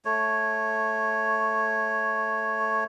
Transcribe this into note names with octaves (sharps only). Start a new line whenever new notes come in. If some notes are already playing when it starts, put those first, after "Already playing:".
A3 C#5